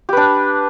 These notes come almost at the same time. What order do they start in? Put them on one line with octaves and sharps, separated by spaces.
G4 B4 D4